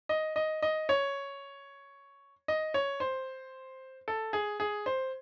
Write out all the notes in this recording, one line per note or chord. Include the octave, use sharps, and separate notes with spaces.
D#5
D#5
D#5
C#5
D#5
C#5
C5
A4
G#4
G#4
C5